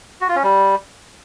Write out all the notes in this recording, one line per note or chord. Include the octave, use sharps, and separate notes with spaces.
F#4
F4
C#4
G3